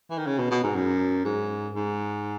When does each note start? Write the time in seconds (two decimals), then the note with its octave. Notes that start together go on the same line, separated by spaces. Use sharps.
0.10 E3
0.18 D#3
0.26 C#3
0.39 B2
0.51 B2
0.64 G#2
0.75 F#2
1.25 G#2
1.75 G#2